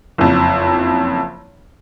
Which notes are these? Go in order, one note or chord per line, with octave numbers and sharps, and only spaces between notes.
F#1 F2